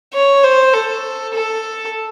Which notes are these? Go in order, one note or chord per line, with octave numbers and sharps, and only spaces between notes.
C#5
C5
A4
A4